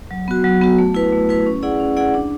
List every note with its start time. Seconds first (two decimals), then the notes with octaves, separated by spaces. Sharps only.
0.11 F#3
0.28 B3 F#4
0.44 F#3
0.61 B3 F#4
0.79 A3
0.95 E4 B4
1.13 A3
1.29 E4 B4
1.46 C#4
1.63 E4 G#4 D5 F#5
1.80 C#4
1.97 E4 G#4 D5 F#5
2.14 D4